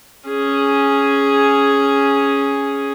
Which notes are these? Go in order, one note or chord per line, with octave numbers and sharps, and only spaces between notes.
C#4 G#4